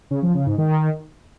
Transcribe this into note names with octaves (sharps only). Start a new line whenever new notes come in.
C#3
F3
C#3
G#2
D#3